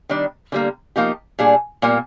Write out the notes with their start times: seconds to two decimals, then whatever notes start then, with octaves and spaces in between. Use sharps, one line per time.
0.09 D#3 G3 D4
0.52 D3 G3 A#3
0.96 F3 A#3 D#4 G4
1.39 A#2 G3 D4 G#4
1.82 A#2 G3 A#3